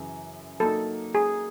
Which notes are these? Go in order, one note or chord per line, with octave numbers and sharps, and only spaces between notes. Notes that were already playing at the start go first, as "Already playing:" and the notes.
Already playing: F#2 C#3 E3
F#3 A#3 D#4 A4
G#4